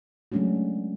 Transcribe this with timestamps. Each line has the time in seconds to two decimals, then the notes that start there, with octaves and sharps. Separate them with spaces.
0.32 F#3 G#3 A3 C#4 D4 F#4